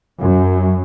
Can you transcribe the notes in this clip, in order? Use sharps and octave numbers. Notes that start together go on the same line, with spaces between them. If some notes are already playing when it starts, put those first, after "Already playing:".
F#2